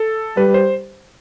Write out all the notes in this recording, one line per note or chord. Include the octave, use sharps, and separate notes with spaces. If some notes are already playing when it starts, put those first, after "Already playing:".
Already playing: A4
G3 B4
C5